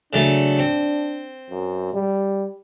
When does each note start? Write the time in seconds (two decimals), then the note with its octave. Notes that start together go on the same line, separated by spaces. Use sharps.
0.13 C#3 F#3 A3 D4
0.59 C4
1.50 F#2
1.94 G3